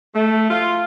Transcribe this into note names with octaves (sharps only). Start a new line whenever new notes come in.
A3
F4